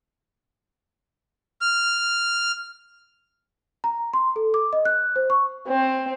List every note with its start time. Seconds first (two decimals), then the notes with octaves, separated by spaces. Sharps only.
1.61 F6
3.84 A#5
4.13 C6
4.36 A4
4.54 D6
4.73 D#5
4.85 F#6
5.16 C5
5.30 C#6
5.68 C4